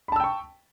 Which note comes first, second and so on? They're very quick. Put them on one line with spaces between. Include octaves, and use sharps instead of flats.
B5 A5 E6 G5 C#6